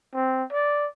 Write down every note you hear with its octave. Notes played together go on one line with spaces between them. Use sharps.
C4
D5